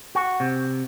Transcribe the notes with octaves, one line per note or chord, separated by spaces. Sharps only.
F#4
C3